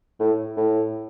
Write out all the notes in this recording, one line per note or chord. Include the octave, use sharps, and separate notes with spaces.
A2
A2